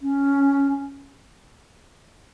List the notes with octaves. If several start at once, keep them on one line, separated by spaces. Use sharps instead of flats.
C#4